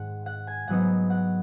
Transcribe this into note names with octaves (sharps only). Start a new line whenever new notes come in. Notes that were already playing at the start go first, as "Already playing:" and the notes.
Already playing: G#2 D#3 G#3 F#5
F#5
G#5
G#2 F#3 B3 D#4 F#5
F#5